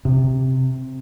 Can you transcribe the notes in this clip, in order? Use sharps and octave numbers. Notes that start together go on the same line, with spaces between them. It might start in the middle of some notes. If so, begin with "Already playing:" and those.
C3